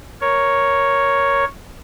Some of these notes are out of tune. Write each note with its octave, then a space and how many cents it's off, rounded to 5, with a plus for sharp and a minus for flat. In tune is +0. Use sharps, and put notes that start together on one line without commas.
A#4 +5 C#5 +0